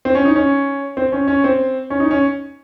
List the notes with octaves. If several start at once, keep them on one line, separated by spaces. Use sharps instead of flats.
C4
C#4
D#4
C#4
C4
C#4
C#4
C4
C#4
D#4
C#4